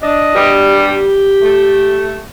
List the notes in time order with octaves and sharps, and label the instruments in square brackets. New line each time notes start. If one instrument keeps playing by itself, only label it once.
[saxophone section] D4 [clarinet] D#5
[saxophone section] G2 B2 G3
[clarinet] G4
[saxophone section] A3